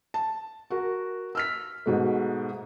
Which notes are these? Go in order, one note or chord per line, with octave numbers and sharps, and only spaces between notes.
A5
F#4 A#4
E6 F6 B6
G#2 B2 A3